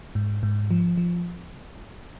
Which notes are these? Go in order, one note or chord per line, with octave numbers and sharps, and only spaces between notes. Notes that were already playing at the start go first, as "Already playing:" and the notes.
G#2
G#2
F3
F3